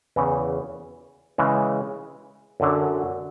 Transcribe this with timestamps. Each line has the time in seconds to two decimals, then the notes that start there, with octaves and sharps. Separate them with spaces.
0.16 E2 C#3 E3
1.38 C#3 E3 G#3
2.60 F#2 D3 F#3